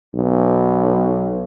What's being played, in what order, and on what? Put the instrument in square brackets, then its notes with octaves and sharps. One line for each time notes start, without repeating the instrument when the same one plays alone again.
[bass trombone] B1